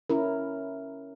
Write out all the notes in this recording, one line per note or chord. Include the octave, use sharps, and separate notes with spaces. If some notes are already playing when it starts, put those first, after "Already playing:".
C#4 E4 A#4